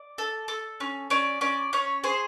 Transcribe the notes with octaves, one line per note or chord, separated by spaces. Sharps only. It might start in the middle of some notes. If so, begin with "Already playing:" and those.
Already playing: D5
A4
A4
C#4
C#4 D5
C#4 D5
C#4 C#5
G#4 C5